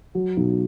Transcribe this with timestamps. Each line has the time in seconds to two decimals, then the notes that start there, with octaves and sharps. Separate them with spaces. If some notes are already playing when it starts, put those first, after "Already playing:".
0.15 F#3
0.37 B1